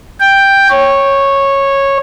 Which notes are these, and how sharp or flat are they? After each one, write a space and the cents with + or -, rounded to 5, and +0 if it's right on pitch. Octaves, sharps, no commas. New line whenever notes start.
G5 +5
C#5 -10